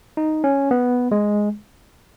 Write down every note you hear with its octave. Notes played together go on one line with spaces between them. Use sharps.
D#4
C#4
B3
G#3